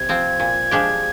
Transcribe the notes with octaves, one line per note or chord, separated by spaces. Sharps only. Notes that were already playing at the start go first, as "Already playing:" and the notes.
Already playing: C3 G#6
F3 C4
A#2
F3 G#3 D4 G4